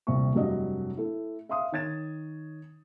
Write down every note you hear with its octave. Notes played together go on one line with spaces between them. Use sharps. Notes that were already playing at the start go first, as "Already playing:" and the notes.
D#1 C2 C3 C4 C#6
F1 C2 G2 F#3 D5 D#5
A3 E4
E5 F5 C6 D#6
D#3 C#5 G#6 A6 E7